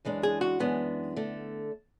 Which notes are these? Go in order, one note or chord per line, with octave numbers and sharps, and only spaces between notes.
F#2 E3 G#3 D4
G#4
F#4
F#2 E3 G#3 B3 D4
D3 A3